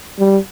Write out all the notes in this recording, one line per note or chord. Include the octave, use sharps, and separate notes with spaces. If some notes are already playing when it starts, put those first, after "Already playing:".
G3